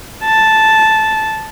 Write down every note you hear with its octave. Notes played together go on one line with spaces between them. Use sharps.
A5